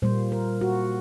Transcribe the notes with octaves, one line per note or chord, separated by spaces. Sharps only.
A#2 G3 A#3 C5
A#4
F#4